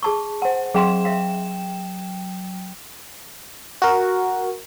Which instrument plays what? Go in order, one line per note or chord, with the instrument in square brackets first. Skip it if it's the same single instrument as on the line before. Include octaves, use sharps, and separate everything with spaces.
[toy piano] G#4 A5 C#6
[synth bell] C5 F#5 [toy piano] G#5
[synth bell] F#3 G5 E7 [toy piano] G#4 F5 C6
[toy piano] E5 F5
[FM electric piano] F#4 A#4